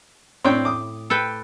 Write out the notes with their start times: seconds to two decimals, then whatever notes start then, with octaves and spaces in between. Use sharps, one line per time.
0.45 A2 C4 D4 C#5 G5
0.65 D6 D#6
1.10 A4 B4 G5